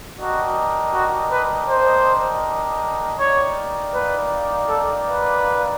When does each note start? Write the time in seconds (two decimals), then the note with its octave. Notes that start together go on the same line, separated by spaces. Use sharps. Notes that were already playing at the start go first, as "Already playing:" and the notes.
0.19 D4 F#4 G4 A#4 D#5
0.94 F#4
1.32 B4
1.69 C5
3.19 D#4 G4 A#4 C#5 D5 F5
3.94 B4
4.69 A4
5.07 B4